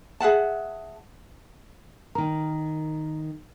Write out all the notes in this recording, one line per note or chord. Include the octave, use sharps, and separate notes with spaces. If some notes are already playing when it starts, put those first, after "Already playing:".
G#4 E5 F#5 A5
D#3 A#4 A#5